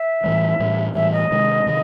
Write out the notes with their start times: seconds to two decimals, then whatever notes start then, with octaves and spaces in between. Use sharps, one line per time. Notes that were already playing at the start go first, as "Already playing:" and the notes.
Already playing: E5
0.24 A2 E3 G3
0.60 A2 E3 G3
0.95 A2 E3 G3 E5
1.13 D#5
1.31 C3 D#3 G#3
1.67 C3 D#3